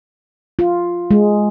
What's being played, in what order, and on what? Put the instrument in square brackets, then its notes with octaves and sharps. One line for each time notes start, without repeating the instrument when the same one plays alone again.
[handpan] F4
G#3